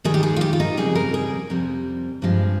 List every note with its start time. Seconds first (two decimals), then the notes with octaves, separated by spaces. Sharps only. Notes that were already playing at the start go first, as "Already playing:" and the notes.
0.04 G#2 D#3 G3 G#4
0.14 G4
0.23 G#4
0.36 F4
0.41 G4
0.53 F4
0.60 D#4
0.77 F2 C#3 G3 G#4
0.95 A#4
1.14 G#4
1.50 F2 C3 G3
2.22 G2 F3 G#3